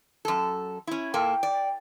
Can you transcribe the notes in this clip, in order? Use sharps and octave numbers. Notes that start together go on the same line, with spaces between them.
F#2 A4
C#4 E4
A#2 A#3 A4 G5
D5